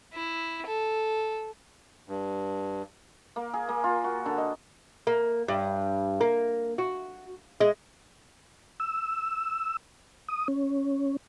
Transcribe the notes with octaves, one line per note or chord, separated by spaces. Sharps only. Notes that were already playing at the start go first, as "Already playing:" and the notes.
E4
A4
G2
A#3
G#4
A#3
F4
F#4
D3
D#5
A#3
G2
A#3
F#4
G#3
E6
D#6
C#4